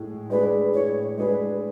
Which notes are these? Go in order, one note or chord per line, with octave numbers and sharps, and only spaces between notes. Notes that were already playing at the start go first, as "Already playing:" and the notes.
Already playing: A2 G#3 G#4
G#3 D4 G#4 B4
A2 C#5
G#3 D4 G#4 B4